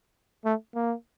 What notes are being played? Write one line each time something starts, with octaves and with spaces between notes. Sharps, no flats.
A3
A#3